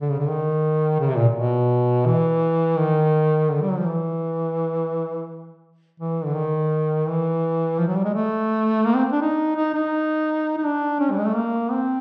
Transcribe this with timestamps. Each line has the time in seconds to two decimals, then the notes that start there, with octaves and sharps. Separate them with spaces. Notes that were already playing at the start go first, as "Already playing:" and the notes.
0.02 D3
0.11 C#3
0.19 D3
0.28 D#3
1.00 C#3
1.09 C3
1.17 A#2
1.35 B2
2.06 E3
2.78 D#3
3.50 D3
3.62 G3
3.70 F#3
3.78 F3
3.86 E3
6.00 E3
6.25 D3
6.36 D#3
7.07 E3
7.78 F3
7.88 F#3
7.97 G3
8.05 G#3
8.14 A3
8.86 A#3
8.94 C4
9.12 D4
9.22 D#4
9.56 D#4
9.74 D#4
10.57 D#4
10.64 D4
11.00 C#4
11.11 G3
11.19 G#3
11.27 A3
11.35 A#3
11.71 C4